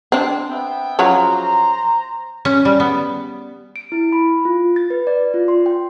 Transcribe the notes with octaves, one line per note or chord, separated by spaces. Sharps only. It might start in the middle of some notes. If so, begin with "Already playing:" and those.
C4 D4
B3 E5 G5
C#3 F3 F#3 C5 A#5
C#4
G3
B3
D7
E4
B5
F4
A6
B4
D5
F4
C6
G5